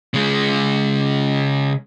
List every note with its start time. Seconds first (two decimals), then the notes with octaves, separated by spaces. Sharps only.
0.14 C#3 G#3